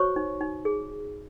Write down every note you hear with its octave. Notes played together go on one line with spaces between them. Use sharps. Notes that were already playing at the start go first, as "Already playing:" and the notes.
Already playing: F#4 C5 C#5 C#6
D#4
D#4
G#4